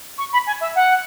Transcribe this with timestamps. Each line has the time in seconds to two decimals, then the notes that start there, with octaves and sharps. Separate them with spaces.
0.18 C#6
0.33 B5
0.47 G#5
0.61 E5
0.76 F#5